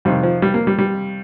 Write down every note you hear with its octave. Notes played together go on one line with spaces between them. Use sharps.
F2 C3 D#3 G3
F3
G3
A#3
G3
G3